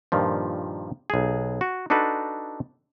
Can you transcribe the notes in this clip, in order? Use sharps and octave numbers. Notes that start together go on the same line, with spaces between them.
G2 A#2 D#3 F3
B1 G#4
F#4
D4 D#4 F#4 A4 B4